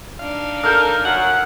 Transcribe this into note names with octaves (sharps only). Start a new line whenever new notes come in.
D4 D#4 F5
A4 A#4 F6 G6
F#2 F#5